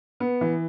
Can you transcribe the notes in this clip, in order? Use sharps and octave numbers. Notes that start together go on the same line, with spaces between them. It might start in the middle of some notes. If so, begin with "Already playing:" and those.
B3
E3